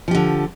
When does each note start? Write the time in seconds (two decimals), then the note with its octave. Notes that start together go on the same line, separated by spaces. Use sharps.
0.08 F3
0.11 G4
0.15 D3